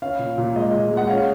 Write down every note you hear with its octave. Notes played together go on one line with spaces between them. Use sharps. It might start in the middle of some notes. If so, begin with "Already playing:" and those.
C#4 F5
A#2
A#2
G#3 D#5
A#2
G#3
F#5
C#4 F5